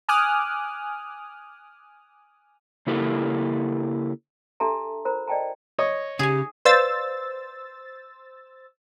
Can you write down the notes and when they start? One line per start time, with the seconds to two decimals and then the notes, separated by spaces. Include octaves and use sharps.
0.09 G#5 D6 D#6 F6 F#6
2.87 C#3 A#3 E4 G4 A4 A#4
4.60 D4 G4 A4 E5 A5 A#5
5.05 F4 A#4 C5 A#5 B5
5.27 D5 D#5 G5 A5 A#5
5.79 C#5 D#5
6.19 C#3 G4 G#4 G#5
6.65 B4 C5 D5 F5 E6 A6